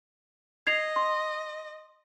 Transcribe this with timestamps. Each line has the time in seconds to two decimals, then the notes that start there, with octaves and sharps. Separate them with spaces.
0.67 D#5 G#6 C7 F7
0.96 C6